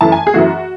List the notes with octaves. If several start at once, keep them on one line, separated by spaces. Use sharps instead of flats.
F#2 E3 A3 A5
G#5
G#4
F#2 E3 A3 F#4